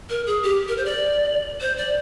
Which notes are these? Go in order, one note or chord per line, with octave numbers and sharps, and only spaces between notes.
A#4
G#4
G4
A#4
C5
D5
C5
D5